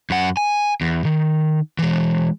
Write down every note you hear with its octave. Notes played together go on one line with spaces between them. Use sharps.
F#2 F#5
G#5
E2
D#3
E3 G#3